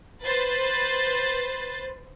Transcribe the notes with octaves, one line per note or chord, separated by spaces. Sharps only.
B4 C5 A6